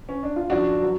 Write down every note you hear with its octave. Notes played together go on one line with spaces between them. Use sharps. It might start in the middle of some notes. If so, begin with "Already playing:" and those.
C#4
D4
F4
F#2 F3 D4 F#4
F#3